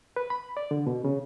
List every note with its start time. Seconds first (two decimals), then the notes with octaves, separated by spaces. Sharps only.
0.16 B4
0.30 B5
0.57 D5
0.71 D3
0.87 B2
1.04 C#3